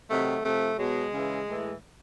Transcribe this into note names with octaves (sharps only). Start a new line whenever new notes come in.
C3 D#3 F#3 A3
C3 F3 A3
B2 F#3 G#3
C#3 E3
A2 E3